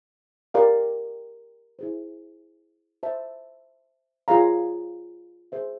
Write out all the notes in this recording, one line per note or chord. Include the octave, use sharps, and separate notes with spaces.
G4 A#4 D5 F5
E4 G#4 C5
C5 E5 A5
F4 G#4 C#5 F5 A#5
G#4 C5 E5